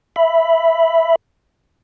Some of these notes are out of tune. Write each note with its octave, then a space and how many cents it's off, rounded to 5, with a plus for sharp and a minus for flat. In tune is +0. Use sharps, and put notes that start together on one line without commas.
E5 +0 B5 +0